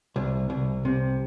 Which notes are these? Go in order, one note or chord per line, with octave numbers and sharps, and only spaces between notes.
C2
C2
C3